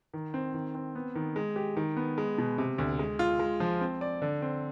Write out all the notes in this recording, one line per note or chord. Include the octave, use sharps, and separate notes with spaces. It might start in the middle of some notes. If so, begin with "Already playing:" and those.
D#3
C4
D#3
C4
B3
D#3
G#3
G4
D#3
B3
G#3
B2
C3
D2
G#3
F4
G#3
F3
C4
D5
D3
C4